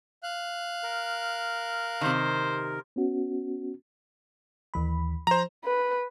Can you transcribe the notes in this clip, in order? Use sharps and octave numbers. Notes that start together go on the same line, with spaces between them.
F5 F#6
A#4
C3 D#3 C5
B3 C#4 F#4
D#2 E3 B5
F3 C5 A#5
B4